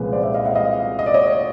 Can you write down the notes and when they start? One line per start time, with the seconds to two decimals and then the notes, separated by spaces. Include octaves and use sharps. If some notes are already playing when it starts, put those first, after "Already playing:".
Already playing: C2 A#2 F3 G#3 C#4 B4
0.13 C5 D5
0.23 D5 E5
0.34 D#5 F5
0.45 E5 F#5
0.55 D#5 F5
0.99 D#5
1.06 D5
1.14 C#5 D#5